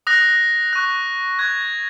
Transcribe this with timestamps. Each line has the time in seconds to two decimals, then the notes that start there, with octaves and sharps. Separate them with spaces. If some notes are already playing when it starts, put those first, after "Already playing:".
0.07 D#6 F#6 A#6
0.73 C#6 F#6
1.39 C#6 F#6 G#6
1.61 A6